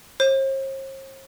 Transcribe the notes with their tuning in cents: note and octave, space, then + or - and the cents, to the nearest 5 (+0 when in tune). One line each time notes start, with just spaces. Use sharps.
C5 +45